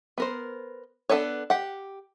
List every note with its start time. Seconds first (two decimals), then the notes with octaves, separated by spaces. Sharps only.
0.18 B3 A#4 C5
1.09 B3 D4 A4 B4 C#5
1.50 G4 F#5